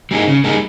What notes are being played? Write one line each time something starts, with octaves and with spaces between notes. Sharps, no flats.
G3 A#3 D#4 G#4
C#3
G3 A#3 D#4 G#4